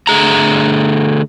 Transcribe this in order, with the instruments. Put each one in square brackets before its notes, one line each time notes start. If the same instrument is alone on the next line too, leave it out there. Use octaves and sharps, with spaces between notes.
[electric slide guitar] D3 A3 G#4 A#5